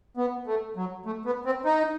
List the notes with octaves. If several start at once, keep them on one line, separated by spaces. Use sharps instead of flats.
B3
A3
F#3
A3
B3
C4
D#4